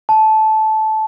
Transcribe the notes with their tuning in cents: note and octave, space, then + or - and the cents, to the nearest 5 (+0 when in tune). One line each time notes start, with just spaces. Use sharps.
A5 -15